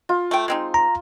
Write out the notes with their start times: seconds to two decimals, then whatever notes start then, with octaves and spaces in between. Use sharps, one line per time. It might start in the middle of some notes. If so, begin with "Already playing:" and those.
0.09 F4
0.31 A3 G5
0.48 G#3 C4 D#4
0.74 A#5